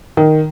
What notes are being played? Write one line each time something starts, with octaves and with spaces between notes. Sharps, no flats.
D#3